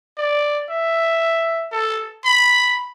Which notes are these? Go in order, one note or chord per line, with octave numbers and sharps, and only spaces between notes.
D5
E5
A4
B5